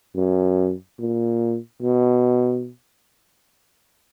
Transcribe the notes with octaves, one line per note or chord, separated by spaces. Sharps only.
F#2
A#2
B2